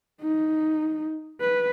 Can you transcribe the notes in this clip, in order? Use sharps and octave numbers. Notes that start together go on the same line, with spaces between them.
D#4
B4